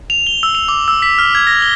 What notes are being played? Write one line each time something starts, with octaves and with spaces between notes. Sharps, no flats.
F7
G7
E6
F7
D6
E6
B6
F6
G#6
A#6
G7